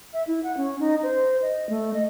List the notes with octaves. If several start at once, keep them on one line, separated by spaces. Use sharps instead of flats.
E5
E4
F#5
C#4
D#4
C5
D#5
A3
D#5